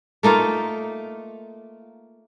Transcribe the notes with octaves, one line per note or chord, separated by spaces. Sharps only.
A3 A#3 D#4 F4